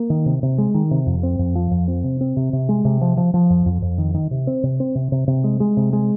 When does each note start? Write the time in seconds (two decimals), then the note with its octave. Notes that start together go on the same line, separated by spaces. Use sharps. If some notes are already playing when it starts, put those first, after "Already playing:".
Already playing: A#3
0.10 D#3
0.26 C3
0.43 C3
0.58 G#3
0.74 D#3
0.91 C3
1.06 F2
1.23 C4
1.39 F2
1.55 F3
1.71 F2
1.88 C4
2.04 C3
2.21 C4
2.37 C3
2.53 C3
2.69 G#3
2.85 C3
3.01 F3
3.17 F3
3.34 F3
3.50 F2
3.66 F2
3.82 F2
3.98 D#3
4.14 D#3
4.31 C3
4.47 C4
4.63 C3
4.80 C4
4.95 C3
5.12 C3
5.28 C3
5.44 G#3
5.60 G#3
5.77 C3
5.93 G#3